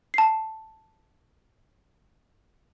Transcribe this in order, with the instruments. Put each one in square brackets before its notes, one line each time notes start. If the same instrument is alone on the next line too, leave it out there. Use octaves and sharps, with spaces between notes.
[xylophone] A5 C7